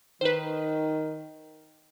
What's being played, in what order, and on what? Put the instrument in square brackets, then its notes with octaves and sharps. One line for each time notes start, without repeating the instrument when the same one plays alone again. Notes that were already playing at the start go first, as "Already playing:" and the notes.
[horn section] D#3 [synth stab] B4 C5